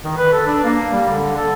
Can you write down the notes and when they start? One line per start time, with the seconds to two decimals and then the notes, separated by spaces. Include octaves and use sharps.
0.05 D#3
0.17 B4
0.32 A4
0.47 D4
0.64 A#3
0.92 G3
1.09 D3
1.37 A4